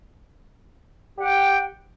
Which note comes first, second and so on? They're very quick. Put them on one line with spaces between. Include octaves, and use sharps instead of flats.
G4 F#5 G5